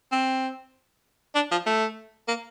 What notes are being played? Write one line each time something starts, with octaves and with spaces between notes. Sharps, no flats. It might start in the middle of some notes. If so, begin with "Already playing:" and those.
C4
D4
F3
A3
A#3